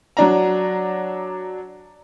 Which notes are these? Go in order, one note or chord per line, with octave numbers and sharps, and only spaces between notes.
F#3 D4 A#5